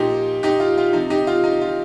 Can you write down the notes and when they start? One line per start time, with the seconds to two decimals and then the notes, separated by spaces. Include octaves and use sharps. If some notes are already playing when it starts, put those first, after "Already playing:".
Already playing: A#2 F3 D#4 G4
0.43 D#4 G4
0.60 F4
0.78 F4
0.93 C3 F3 D#4
1.10 D#4 G4
1.27 F4
1.44 D#4
1.61 F4